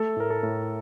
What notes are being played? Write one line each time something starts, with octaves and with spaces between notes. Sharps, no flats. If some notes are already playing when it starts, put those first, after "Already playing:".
Already playing: A3 A4
A2 A#4
A4
A2